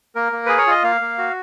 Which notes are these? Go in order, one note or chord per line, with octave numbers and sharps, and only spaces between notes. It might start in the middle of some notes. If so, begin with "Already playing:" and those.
A#3 A#4
A#3
G#4 B4
C#5
F4 D#5
A#3 F5
A#3
F#4